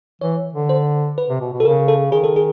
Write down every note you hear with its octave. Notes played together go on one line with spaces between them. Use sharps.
E3 C#5
D3
C5
B4
C3
B2
B2
A4
C#3 A#4
A4
D#3 G#4
A4
G#4